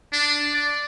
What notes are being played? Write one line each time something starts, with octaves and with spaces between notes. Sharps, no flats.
D4
D5